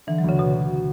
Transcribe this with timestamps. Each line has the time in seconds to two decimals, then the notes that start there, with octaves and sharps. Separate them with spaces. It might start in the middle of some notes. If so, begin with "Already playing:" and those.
0.07 D3 E3
0.18 F#3
0.24 D2 C#3
0.39 B2 F#3